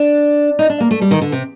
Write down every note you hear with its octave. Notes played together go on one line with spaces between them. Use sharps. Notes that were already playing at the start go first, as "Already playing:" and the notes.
Already playing: D4
D#4
D4
A#3
A3
G3
D#3
D3
C3